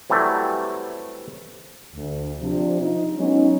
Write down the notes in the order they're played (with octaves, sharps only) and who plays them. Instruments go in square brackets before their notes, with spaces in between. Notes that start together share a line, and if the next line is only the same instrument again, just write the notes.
[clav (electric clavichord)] C3 E3 F#3 G3 A3
[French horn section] D2
C3 F3 D4
D#4 F4
F#3 G#3 B3 C#4 D#4